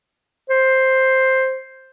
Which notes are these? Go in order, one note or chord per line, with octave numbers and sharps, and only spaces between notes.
C5